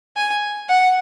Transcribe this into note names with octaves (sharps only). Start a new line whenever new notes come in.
G#5
F#5